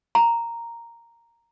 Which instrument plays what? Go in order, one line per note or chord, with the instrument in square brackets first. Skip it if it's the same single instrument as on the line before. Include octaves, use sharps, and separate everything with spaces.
[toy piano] A#5